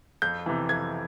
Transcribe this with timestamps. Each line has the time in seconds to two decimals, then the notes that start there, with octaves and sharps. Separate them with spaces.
0.22 F2 G6
0.46 C3 E3
0.69 F2 G#6